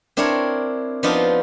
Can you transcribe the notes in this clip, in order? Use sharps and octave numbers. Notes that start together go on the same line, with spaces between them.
C4 D4 E4 A#4 C#5
F3 B3 D4 D#4 F4